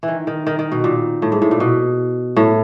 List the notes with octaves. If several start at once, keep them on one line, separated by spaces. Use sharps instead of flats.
E3
D#3
D#3
D#3
D#3
B2
A#2
A2
G#2
A2
A#2
B2
A2